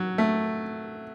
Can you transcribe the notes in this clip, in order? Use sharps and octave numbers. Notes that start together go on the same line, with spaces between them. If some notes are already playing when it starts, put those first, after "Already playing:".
Already playing: F#3
A3